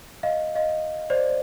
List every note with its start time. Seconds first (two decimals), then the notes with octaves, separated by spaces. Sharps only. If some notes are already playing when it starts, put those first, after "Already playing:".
0.23 D#5 F5
0.55 D#5 F5
1.10 C5 D5